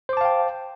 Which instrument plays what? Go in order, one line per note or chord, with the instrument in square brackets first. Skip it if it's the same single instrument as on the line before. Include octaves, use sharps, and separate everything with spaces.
[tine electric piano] C5
D6
A5
F5
G5